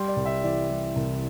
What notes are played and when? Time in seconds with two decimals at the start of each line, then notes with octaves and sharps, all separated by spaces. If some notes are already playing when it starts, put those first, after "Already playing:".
Already playing: G3 G5 C6
0.08 D5
0.16 C2
0.25 E5
0.43 E3 D5
0.70 G3
0.96 C2